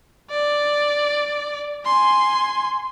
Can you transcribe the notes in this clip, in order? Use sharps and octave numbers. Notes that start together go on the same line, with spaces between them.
D5
G#5 C6